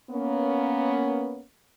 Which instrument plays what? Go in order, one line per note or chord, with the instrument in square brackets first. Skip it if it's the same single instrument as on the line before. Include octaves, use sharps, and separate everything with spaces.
[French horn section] A#3 B3 C#4